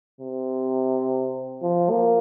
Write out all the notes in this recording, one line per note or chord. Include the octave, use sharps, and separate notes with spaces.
C3
F3
A#3